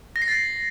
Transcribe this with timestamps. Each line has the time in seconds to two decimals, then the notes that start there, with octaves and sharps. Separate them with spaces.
0.16 A#6
0.22 C7
0.28 A6